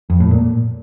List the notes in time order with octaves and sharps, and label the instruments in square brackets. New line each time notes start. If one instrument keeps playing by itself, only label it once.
[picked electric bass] F2
A2
A#2